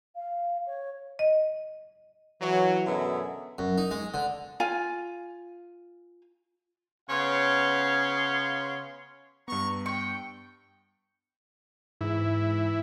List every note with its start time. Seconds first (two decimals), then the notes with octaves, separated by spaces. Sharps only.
0.15 F5
0.66 C#5
1.19 D#5
2.41 E3 F#3
2.86 F#2 B2 D3 B3 G#4 E5
3.58 F#2
3.78 D#4
3.91 G#3
4.14 D3
4.60 F4 G#5
7.10 C#3 B3 C#5 F5 C6
9.48 G2 B3 A#5 C#6
9.86 G5 C#6
12.01 G#2 E3 E4